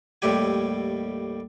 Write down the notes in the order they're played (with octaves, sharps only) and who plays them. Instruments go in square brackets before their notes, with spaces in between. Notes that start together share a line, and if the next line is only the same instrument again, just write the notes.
[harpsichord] D#2 A2 G3 G4 G#5